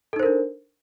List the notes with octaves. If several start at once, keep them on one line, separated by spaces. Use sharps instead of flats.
D4 D#4 A4 A#4 C5